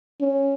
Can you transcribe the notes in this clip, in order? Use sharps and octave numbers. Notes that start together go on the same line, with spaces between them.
C#4